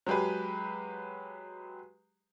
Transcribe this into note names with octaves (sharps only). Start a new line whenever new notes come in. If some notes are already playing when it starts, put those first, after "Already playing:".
F#3 G#3 G4 G#4 B4